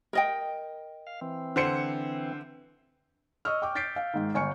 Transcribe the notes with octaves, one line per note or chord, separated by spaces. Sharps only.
A#4 D#5 G5
F5
E3 C4
D3 C5 C#7
D#5 C#6 E6 F6
G5 C#6 D6
G6 A6 B6 C7 D7
F5
G#2 D#3
G1 G#5 C#6 F6 C#7